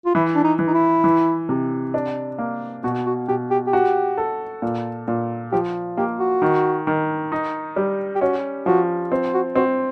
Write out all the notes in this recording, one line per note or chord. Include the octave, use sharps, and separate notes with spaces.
F4
E3 E4
D4
D#4
E3
D#4
E4
E3
C3
D4
A#3
B2 F#4
F#4
B2 G4
G4
G4
F#4
A4
A#2
A#2
F3 G4
A#3 G4
F#4
D#3
D#3
D#4
G3
G4
C#4 F#4
F3 F#4
C4
F#4
C4 F#4